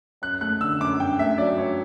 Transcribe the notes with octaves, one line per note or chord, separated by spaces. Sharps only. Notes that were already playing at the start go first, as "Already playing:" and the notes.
F#2 F#6
A3 F#6
D3 E6
F#2 D6
G2 G5
A3 E5
F#3 D5
G2 C#5